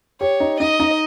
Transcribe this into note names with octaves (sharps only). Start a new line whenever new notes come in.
G4 C#5
D#4
D#4 D#5
D#4